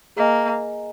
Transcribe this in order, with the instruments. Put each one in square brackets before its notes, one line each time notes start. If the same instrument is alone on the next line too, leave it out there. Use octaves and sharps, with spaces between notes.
[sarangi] A#3 [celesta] G#4 D#5 G#5